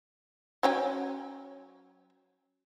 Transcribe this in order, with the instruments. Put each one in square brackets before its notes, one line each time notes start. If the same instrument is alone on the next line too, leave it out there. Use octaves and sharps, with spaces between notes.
[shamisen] F#3 C#4 G5